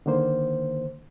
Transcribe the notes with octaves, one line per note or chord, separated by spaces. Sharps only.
D3 D#3 A#3 C5